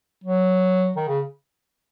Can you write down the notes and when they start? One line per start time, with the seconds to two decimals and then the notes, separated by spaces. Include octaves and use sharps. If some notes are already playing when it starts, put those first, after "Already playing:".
0.24 F#3
0.96 D#3
1.08 C#3